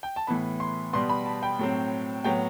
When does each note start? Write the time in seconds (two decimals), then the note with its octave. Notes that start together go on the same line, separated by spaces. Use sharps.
0.03 G5
0.16 A5
0.27 A2 E3 B3 B5
0.60 C6
0.93 B2 G3 B3 C6
1.09 B5
1.26 A5
1.43 G5
1.59 A2 F#3 C4
2.24 A2 F#3 B3 G5